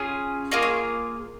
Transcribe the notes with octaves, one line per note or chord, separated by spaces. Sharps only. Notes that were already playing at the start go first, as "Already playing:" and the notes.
Already playing: C#4 F4 G#4
A#3 F4 G#4 D#5
C#5